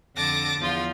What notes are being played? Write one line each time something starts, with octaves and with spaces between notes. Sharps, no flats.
F2 D3 A5 D6 A#6
E2 F3 F4